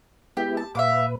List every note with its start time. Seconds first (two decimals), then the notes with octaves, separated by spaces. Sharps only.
0.37 G#3 B3 E4 G4
0.57 A5
0.75 A#2 B4 E5 F5 D6